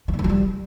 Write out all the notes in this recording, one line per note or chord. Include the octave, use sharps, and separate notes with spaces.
F3
D3
E3
F3
G3